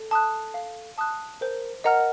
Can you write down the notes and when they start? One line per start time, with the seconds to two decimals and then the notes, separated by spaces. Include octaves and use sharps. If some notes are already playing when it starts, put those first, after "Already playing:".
Already playing: A4
0.11 A5 D#6 F#6
0.54 F5
0.98 A5 D#6 F#6
1.41 A#4 C5
1.84 A#4 D#5 F#5 A#5 F6